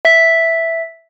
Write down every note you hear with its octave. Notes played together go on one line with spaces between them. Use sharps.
E5 B6